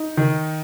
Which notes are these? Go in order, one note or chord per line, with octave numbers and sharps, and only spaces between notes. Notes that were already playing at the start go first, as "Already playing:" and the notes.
Already playing: D#4
D#3